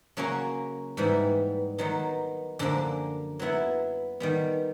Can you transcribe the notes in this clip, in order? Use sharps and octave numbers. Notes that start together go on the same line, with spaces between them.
C#3 F#3 A#3 C#4 F#4
G#2 E3 G3 B3
D#3 F#3 B3 D#4
F#2 D3 F3 A#3
F#3 B3 E4
D#3 G3 B3